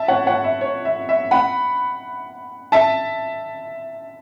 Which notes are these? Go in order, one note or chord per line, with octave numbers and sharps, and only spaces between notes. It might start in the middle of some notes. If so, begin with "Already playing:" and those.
Already playing: E5 A5
C#5 F#5
C#5 F#5
E5
C#5
E5
E5
F#5 B5
E5 A5